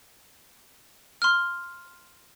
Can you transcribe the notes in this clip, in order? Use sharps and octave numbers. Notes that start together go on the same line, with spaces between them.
C6 F6